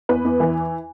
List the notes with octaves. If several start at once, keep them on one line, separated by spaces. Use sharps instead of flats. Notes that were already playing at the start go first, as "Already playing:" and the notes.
E2 B4
E2
E3